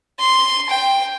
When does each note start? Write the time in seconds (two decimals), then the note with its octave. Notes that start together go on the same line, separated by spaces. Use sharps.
0.19 C6
0.70 G5